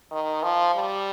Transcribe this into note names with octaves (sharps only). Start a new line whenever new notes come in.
D#3
F3
G3